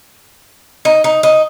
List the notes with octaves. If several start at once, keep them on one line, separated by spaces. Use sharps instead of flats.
D#4
D#4
D#4